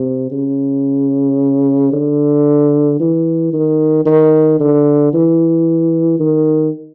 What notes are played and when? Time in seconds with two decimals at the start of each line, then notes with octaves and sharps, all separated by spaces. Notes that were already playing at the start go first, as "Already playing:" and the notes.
Already playing: C3
0.32 C#3
1.93 D3
3.00 E3
3.53 D#3
4.06 D#3
4.60 D3
5.13 E3
6.20 D#3